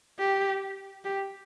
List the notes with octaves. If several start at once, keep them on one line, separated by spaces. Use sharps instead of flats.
G4
G4